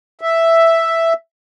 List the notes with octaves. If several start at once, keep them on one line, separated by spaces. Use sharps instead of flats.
E5